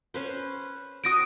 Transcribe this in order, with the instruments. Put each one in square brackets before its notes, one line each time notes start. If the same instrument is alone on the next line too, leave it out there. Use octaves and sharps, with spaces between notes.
[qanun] C#4 B4 C5
[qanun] C4 F#4 [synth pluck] D#6 A#6 D7